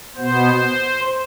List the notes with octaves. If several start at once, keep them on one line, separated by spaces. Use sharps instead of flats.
B2 B3 C5